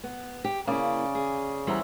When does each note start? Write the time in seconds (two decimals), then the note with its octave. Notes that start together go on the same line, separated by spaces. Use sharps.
0.03 B3
0.44 G4
0.67 C#3 A#3 E4 D5
1.15 G#4
1.67 E3 G3 B3 C5 E5 A#5